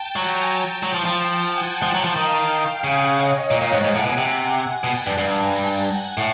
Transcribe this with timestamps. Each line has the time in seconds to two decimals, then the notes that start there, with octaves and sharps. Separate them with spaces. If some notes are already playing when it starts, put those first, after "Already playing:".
Already playing: G5 A5
0.16 F#3 G#5 A#5
0.48 G5 A5
0.83 F#3
0.94 F3
1.05 F3
1.49 F#5 G#5
1.83 F3 G5 A5
1.94 F#3
2.05 F3
2.16 D#3 F5 G5
2.83 C#3 F#5 G#5
3.16 C#5 D#5
3.50 A#2 F5 G5
3.61 A#2
3.72 G#2
3.84 G#2 F#5 G#5
3.95 A2
4.05 B2
4.17 C3
4.84 B2 G5 A5
5.07 G2
5.17 G2 G#5 A#5
5.51 G5 A5
5.84 F#5 G#5
6.17 A2